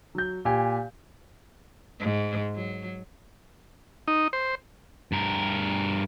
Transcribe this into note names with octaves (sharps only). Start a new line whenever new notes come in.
F#3 G6
A#2 G4 G#5
G#2
F#3
D#4
C5
G2 A#4